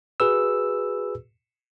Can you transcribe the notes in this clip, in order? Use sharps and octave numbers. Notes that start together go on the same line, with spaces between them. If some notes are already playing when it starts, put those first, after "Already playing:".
F#4 G#4 B4 E6